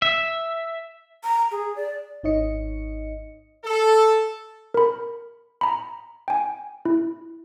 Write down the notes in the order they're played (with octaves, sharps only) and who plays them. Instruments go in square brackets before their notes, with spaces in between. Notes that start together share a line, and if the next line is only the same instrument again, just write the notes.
[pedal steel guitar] E5
[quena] A#5
G#4
D5
[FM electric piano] G#1 D#4 C#5 D#5 C#7
[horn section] A4
[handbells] A#4 B5
A#5 B5
G5 G#5
E4